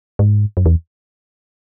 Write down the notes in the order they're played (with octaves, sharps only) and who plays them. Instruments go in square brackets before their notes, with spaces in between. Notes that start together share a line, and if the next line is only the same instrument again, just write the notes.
[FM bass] G#2
F#2
E2